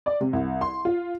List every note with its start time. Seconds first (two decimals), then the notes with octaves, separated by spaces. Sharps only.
0.06 D5
0.21 C3
0.33 C2
0.61 C6
0.85 F4